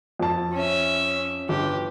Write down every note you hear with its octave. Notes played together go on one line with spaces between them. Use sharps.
F2 A5
C#4 E5
G1 G4